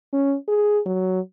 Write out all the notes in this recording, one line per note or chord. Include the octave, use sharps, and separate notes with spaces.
C#4
G#4
F#3